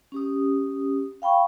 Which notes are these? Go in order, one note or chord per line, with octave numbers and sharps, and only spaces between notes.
C#4 G4 D#6
F5 G5 B5 C#6